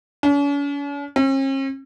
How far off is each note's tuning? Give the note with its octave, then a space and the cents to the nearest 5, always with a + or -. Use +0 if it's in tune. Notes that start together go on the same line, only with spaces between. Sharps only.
C#4 +45
C#4 -45